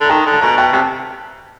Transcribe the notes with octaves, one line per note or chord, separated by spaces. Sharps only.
D3 A#5
D#3 G5 A5
D3
A5
B2 G#5 A#5
B2 G5 A5
C3 G5 A5